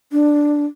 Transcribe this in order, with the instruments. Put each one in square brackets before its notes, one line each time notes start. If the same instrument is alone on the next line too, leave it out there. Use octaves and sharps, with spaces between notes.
[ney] D4